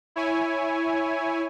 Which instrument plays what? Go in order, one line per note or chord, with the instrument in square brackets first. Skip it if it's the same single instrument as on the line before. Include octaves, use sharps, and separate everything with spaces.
[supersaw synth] E4 C#5 G#5